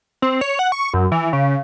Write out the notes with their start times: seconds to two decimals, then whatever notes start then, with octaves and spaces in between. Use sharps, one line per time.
0.22 C4
0.41 C#5
0.59 F#5
0.72 C#6
0.94 F#2
1.12 E3
1.33 C#3